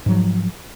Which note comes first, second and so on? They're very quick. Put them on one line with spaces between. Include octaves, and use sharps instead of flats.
G#2 F#3 F3